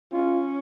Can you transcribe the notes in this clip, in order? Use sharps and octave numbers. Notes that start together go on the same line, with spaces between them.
C#4 F4